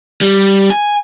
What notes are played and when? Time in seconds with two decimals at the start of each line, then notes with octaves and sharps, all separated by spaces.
0.21 G3
0.70 G#5